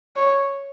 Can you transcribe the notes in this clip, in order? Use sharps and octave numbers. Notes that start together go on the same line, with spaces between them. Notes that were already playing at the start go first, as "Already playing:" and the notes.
C#5